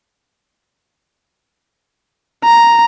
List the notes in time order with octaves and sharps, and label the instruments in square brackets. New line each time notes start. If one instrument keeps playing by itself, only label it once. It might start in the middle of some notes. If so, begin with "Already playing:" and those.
[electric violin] A#5